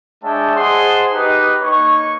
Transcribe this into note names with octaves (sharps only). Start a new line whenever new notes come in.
G#3 D4 C#5 E5 G5 A5
G#4 C5 D#5 F#5 A5 C6
D#4 G4 B4 D#5
A#3 D#4 C#5 C#6